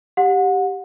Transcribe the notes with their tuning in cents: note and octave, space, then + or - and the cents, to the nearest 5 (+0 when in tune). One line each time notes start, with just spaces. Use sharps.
G4 +0 F#5 -30